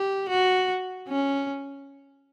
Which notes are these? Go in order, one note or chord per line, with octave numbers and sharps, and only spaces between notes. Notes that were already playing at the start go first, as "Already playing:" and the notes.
Already playing: G4
F#4
C#4